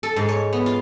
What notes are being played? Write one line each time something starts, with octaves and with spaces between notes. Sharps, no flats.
A4
G#2
C#5
B3
F4